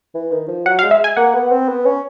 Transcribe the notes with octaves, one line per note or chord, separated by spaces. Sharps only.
E3
D#3
F3
F#3 F#5
F5
G#3
E5
G#5
A#3 F#5
B3
C4
B3
C#4